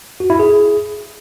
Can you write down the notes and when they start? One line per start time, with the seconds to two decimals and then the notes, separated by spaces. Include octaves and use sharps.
0.20 F#4
0.30 E4
0.39 G#4